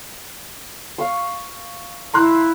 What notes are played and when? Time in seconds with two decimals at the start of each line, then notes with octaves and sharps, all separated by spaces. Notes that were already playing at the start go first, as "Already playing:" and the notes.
0.98 F5 C#6
2.14 E4 A#5 C6 F#6